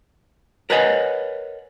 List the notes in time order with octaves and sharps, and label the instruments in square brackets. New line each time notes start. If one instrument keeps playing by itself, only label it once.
[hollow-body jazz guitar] A#4 B4 C#5 D#5 F#5 G#5